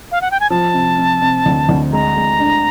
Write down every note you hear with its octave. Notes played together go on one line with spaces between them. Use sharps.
F5
F#5
G5
G#5
F3 A5
C3
C3
C3
D2
D2
G#3 A#5
G#3
D4